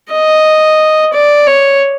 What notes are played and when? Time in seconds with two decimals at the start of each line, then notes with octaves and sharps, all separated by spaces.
0.12 D#5
1.13 D5
1.47 C#5